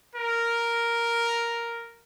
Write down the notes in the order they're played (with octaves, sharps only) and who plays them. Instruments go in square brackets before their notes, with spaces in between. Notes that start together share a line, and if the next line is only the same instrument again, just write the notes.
[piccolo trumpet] A#4